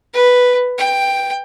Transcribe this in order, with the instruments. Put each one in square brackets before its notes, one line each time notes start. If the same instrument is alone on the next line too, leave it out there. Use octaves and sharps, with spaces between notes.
[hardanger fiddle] B4
G5